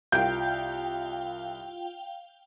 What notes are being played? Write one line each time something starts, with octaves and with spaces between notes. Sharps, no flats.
C2 F4 F5 G5 G6